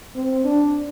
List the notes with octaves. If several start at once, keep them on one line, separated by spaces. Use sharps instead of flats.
C4
D4